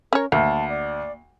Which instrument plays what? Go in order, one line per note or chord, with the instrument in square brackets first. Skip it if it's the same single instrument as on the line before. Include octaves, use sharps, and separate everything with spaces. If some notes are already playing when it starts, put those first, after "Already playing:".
[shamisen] C#4 C#5 [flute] A#4
[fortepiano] D2 [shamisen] A#3 [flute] A5
[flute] D5